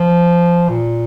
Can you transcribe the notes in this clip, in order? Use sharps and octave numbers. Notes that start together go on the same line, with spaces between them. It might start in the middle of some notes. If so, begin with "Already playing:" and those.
Already playing: F3
A#2